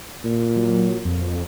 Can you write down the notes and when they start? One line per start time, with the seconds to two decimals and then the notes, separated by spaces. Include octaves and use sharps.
0.24 A#2
0.56 F#3
1.05 F2